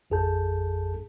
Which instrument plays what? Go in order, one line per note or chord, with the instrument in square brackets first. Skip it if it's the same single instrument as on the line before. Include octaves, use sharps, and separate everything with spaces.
[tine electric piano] A1 F2 G#4 A4 A5 G6